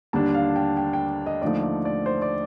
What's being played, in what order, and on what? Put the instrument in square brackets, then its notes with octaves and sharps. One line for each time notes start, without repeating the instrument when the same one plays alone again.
[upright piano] D#2 D3 G3 D4 A5
F5
G5
G5
G5
D#5
D#2 D3 F3 A3 D#4 D5
D5
D5
C5
D5